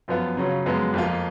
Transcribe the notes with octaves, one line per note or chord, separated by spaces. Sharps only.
F#2 F3 B3 F4
C#3 F#3 C#4 F4
F#2 F3 G#3 B3
F2 F3 A#3 F4